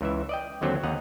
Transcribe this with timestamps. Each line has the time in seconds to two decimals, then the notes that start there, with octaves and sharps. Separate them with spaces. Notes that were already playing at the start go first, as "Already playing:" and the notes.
0.01 C#2 E3 E5
0.29 D5 D#5 G5
0.62 D#2 D3 F#3 C4
0.83 D#2 D#5 F#5 A#5